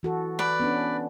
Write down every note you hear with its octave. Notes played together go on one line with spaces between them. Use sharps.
E3 F#4 A4
B4 D5
B3 C#4 D4